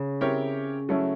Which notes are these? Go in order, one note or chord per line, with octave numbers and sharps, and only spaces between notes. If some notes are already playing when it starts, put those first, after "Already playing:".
Already playing: C#3
C4 E4 G4 A#4 C#5
F#3 A3 C#4 E4 A4